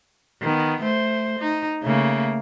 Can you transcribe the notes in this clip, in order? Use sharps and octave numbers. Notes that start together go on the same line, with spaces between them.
D#3 B3
A3 C5
D#4
C#3 A3 A#3